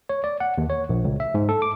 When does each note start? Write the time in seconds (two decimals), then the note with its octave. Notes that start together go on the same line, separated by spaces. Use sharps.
0.09 C#5
0.24 D5
0.40 F#5
0.58 D#2
0.70 C#5
0.89 A#1
1.05 C#2
1.20 E5
1.34 G#2
1.49 A4
1.62 D6